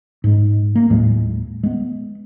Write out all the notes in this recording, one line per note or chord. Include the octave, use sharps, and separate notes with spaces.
G#2 G#3
A#3
D#2 A2 F#3 G#3
G#3 B3